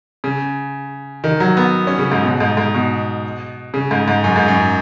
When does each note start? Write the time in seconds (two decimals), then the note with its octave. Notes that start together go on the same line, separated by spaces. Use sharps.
0.24 C#3
1.24 D#3
1.40 F#3
1.57 B3
1.87 C#4
1.98 C#3
2.11 G#2
2.23 B2
2.40 G#2
2.57 G#2
2.74 B2
3.74 C#3
3.91 G#2
4.08 G#2
4.24 F#2
4.36 G#2
4.48 F#2